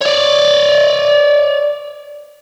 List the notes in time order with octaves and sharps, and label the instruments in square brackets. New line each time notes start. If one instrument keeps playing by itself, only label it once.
[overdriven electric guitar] C#5 D5